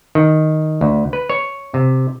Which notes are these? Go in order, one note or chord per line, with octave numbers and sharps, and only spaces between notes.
D#3
D2
B4
C#5
C3